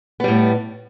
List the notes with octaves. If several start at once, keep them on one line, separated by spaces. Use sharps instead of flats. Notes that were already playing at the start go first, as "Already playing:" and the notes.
A2 G3 B3